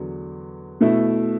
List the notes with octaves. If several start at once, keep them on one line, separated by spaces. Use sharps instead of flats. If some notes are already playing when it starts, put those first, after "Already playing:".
Already playing: E2 D3 F#3
B2 A3 E4